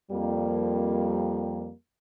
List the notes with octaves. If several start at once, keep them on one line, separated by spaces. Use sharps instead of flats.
F2 G3 A#3